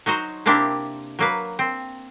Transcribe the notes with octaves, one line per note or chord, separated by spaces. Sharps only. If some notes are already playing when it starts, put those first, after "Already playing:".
F#3 D#4 F#4 C5
C3 A#3 C4 D4 E4 G4
F#3 A#3 B4
C4